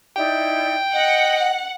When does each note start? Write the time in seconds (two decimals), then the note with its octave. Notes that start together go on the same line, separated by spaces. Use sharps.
0.16 D#4 E4 D5 G5
0.93 D#5 F#5